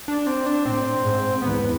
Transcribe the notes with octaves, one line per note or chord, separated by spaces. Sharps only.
D4
C4
D4
A2 C4
G#2
E2 B3